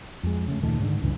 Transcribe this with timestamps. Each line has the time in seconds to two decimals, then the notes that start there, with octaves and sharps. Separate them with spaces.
0.23 F2 G#3
0.48 C#3 A3
0.63 D2 A#2 D#3 A3
0.80 G#2 D3 D#3
1.02 C#2 G2 C#3 E3